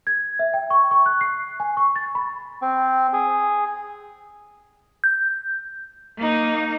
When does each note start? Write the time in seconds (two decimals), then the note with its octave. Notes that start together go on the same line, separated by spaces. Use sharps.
0.07 G#6
0.39 E5
0.54 G5
0.70 C#6
0.91 C#6
1.06 F#6
1.21 C7
1.60 G#5
1.77 C#6
1.96 A6
2.15 B5
2.62 C4
3.13 G#4
5.04 G6
6.17 A#3 D#4